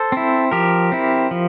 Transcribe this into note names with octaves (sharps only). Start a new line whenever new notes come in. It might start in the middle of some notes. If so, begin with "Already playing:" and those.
Already playing: A4 C5
C4 E4
F3 G4 A#4
C4 E4
F3